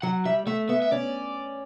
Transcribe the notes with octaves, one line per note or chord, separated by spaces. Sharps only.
F#3 F#5
G3 E5
A3 E5
B3 E5
E5
C#4 D5